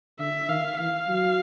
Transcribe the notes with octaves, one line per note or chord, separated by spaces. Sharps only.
D3 E5
D#3 F5
E3 F5
F#3